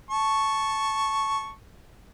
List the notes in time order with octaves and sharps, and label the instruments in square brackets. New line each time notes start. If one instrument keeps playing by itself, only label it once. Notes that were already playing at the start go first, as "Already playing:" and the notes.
[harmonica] A5 C#6